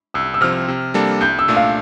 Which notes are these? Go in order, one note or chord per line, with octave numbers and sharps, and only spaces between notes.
C2 E6
E6
C3 F3 C4 F6
C3
G3 A#3 D4 A4
C2 G6
E6
A#2 A3 D4
F5